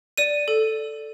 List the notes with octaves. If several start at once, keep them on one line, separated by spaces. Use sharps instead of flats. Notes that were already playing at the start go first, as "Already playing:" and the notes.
D5 D#7
A4